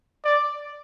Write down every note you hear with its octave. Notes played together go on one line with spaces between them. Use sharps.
D5